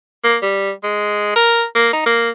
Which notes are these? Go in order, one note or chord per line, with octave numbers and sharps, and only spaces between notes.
A#3
G3
G#3
A#4
A#3
D#4
A#3